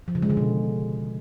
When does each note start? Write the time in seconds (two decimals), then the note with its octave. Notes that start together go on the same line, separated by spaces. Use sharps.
0.08 F3
0.15 C#3
0.22 G#3
0.30 D3
0.37 B2